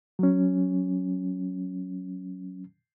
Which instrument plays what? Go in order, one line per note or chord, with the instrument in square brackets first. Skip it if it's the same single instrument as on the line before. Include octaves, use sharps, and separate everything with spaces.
[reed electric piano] F#3 C#4